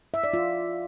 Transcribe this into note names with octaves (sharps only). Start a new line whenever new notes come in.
E5
D5
F4